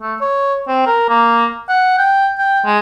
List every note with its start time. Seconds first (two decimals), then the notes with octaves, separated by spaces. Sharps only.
0.01 A3
0.21 C#5
0.68 C4
0.87 A#4
1.09 A#3
1.69 F#5
1.98 G5
2.38 G5
2.65 G#3